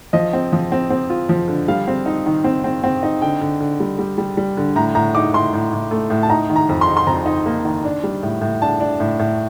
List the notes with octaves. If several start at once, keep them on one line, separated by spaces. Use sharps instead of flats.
F3 D#5
C4
F3
C4
C4
F4
F3
D3
G3 F5
C4
D#4
D#3
C4
C4
C4
D#4
D3 G5
D3
D3
G3
G3
G3
G3
D3
A2 A#5
A2 A#5
D#4 D6
A2 C6
A2
A2
A3
A2
A5
D#4 A#5
D#3
A#5
F2
C6
D#4
C6
F2 A#5
D#4
A#3
D#3
D4
G3
A2
A2
D4 A5
D4
A2
A2